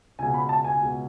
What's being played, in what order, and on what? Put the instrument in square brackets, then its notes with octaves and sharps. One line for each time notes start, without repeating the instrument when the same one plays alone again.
[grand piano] C#2 B2 G#3 [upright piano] G#5
[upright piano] B5
A5
G#5
[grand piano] C#2 B2 G#3